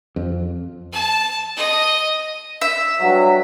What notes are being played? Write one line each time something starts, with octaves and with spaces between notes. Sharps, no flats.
F2
A5
D#5
E5
G2 F#3